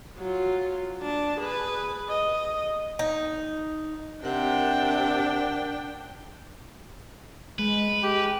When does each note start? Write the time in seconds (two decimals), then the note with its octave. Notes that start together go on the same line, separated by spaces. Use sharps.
0.18 F#3 F4
1.02 D4 A5
1.40 G#4 B4
2.08 D#5
2.99 D#4
4.24 C3 D4 A#4 F#5 G5
7.59 G#3 B4
8.03 G#3 G4